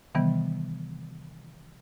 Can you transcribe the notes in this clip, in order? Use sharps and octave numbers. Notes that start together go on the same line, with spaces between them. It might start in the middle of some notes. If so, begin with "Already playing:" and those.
C3 D#3 E3 G3 B3